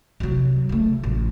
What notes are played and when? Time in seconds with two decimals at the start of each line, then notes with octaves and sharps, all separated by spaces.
0.20 C3 F#3
0.69 C#3 A3
1.04 A1